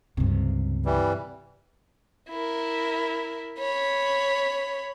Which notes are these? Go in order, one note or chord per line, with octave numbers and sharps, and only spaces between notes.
C#2 G2 C3
E3 G3
E4 A#4
C#5 B5